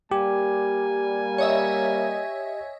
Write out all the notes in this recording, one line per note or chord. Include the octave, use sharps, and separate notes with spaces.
G3 A#3 G4 G#5
C#5 D#5 E5